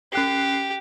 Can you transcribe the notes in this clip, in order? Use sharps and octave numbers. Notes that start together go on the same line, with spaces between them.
C#4 G4 F#6 C7